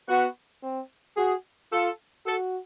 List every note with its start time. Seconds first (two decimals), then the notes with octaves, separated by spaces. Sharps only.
0.09 B3 F#4
0.63 C4
1.17 F#4 G#4
1.72 F4 A4
2.26 F#4 A4